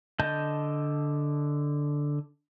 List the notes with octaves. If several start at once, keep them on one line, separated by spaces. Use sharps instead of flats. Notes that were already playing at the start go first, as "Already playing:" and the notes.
D3 D#5 A5 G6